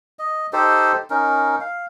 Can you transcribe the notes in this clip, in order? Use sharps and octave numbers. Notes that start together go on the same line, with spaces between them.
D#5
D#4 G4 A4 C5
C#4 D#4 A#4
F5